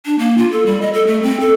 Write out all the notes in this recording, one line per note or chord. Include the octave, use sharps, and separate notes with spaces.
D4
A#3
F4
A4
G3
D#5
A4
A3
C4
A4